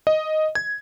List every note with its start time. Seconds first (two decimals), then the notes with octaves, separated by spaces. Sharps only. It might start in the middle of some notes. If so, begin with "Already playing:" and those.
0.07 D#5
0.55 G#6